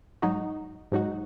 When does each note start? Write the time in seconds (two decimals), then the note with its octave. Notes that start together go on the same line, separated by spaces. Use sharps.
0.22 G#2 F#3 D#4 F#4
0.92 G#2 F#3 D#4 F#4